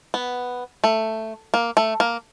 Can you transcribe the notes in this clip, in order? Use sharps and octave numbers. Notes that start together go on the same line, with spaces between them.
B3
A3
A#3
A3
A#3